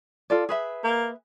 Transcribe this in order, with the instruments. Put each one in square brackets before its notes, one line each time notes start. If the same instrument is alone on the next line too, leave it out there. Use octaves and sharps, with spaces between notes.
[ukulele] F4 A4 D5
G#4 B4 E5
[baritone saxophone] A#3